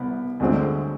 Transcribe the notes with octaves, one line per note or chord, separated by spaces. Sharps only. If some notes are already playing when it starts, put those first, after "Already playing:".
Already playing: C2 B3
D2 D3 G#3 C4